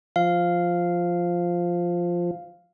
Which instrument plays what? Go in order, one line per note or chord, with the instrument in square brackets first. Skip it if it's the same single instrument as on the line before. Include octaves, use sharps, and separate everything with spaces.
[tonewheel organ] F3 [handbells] F5